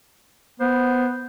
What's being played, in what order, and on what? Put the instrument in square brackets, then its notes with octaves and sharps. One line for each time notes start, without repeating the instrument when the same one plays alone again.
[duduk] B3 [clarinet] C5